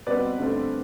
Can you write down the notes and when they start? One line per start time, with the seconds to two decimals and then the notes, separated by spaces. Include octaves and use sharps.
0.07 B2 G3 C4 B4 D5
0.39 G2 D3 A3 C4